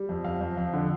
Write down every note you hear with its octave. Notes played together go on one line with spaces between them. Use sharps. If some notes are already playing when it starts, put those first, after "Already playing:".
Already playing: G3
F2
F2 F5
F2
F2
D3